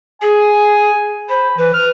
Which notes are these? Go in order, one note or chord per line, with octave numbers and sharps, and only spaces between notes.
G#4 G#5
C5 B5
E3 B4
F6